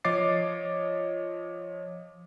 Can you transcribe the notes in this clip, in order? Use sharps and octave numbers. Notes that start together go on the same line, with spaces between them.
F3 C#5 D#5 D6 A6 C7